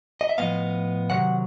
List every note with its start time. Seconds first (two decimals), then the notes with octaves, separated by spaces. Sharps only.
0.21 D#5
0.29 E5
0.38 A2 F3 G#3 B3 D#5 F5
1.10 C3 D#3 F#3 F#5